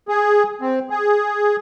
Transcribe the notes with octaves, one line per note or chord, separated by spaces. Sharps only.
G#4
C4
G#4